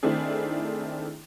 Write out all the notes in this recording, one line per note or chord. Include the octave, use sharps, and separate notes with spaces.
D#3 A3 C4 D4 E4 G#4